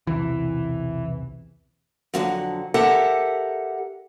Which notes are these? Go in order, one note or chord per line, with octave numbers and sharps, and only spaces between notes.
B1 E2 C3 E3
F2 D3 F3 F#3
G4 A4 A#4 E5 F#5